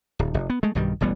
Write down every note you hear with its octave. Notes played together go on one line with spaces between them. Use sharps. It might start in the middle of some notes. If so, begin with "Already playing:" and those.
D1
F1
B3
G#3 A3
B1 G2 D#3 G3
E1 A1 G3 B3